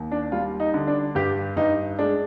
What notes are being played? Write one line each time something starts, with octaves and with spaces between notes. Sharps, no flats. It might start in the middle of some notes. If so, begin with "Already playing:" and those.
Already playing: D#2
D4
G3 F4
D#4
D3
D4
G2 G4
G2 D#4
G#3 D4